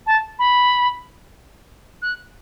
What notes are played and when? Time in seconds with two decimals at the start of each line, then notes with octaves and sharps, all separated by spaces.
0.06 A5
0.39 B5
2.02 F#6